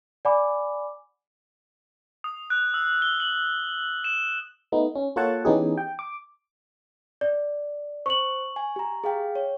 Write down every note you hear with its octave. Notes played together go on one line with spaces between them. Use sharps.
D5 F#5 G#5 B5 D6
D#6
F#6
E6
G7
F#7
E7
A3 B3 D#4
C#4
A#3 F4 A4 C#5 F#5 A5
E3 B3 C#4 D#4 G4 G#4
G5
D6
D5
C5 C#6 F#7
G#5
G4 A#5
G#4 F5 G5
C#5